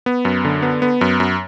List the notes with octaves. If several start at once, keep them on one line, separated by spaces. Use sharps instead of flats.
B3
F#2
D3
B3
B3
F#2
F#2